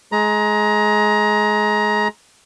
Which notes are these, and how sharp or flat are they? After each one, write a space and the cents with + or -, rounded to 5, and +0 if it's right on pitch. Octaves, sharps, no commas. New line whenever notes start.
G#3 +25 A#5 +20